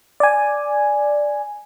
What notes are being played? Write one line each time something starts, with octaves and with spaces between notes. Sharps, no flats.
D5 G#5